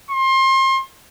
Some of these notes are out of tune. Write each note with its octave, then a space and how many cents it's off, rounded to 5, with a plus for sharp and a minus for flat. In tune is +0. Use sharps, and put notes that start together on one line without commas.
C6 +30